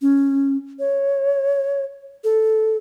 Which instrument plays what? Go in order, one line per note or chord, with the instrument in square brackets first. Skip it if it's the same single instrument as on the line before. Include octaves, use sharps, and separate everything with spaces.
[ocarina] C#4
C#5
A4